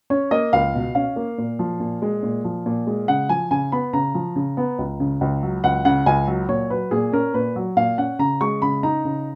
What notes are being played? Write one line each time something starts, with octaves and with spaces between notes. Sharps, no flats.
C#4 C#5
A#3 D#5
C#2 F5
B2
C#4 F5
A#3
A#2
F3
A#2
G#3
A#2
F3
A#2
G#3
C#3 F#5
F3 G#5
C#3 G#5
B3 B5
C#3 A#5
F3
C#3
B3
C#2
C#3
C#2
F#3
C#2 F#5
C#3 F#5
C#2 G#5
F#3
A#2 C#5
F#3 B4
A#2 G#4
C#4 A#4
A#2 B4
F#3
A#2 F5
C#4 F#5
C#3 A#5
G#3 C#6
C#3 B5
D#4 A#5
C#3